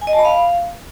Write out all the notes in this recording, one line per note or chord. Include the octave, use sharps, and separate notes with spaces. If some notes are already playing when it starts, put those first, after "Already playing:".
G#5
D#5
A5
B5
F5